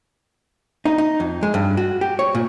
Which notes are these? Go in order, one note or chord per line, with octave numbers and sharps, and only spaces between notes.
D#4
D#4
F2
G#3
G2
F#4
G4
C#5
A#2